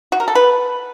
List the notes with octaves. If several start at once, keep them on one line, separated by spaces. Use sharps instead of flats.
F#4
A#4
A4
B4